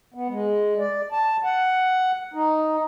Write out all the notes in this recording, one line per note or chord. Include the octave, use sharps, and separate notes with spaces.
B3
G#3
D5
A5
F#5
D#4